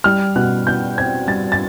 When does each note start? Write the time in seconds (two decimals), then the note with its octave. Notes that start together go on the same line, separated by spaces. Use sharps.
0.04 G3 F6
0.36 B2 F#6
0.67 B2 G6
0.98 C4 G#6
1.28 G3 A6
1.52 A6